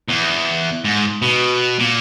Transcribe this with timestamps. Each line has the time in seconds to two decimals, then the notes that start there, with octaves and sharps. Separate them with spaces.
0.08 E2
0.84 G#2
1.22 B2
1.79 A#2